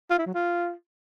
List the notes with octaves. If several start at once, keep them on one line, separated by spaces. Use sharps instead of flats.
F4
E4
F#3
F4